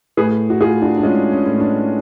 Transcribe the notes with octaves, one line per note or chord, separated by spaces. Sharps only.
A2 G#4 B4
F#4
A2 F4 G#4
D4 F#4
D4
G#3 C#4 F4
C#4
A2
D4